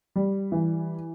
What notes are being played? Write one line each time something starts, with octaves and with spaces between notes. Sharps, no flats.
G3
E3